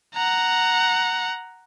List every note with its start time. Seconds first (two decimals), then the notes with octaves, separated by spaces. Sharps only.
0.14 F#5 A#5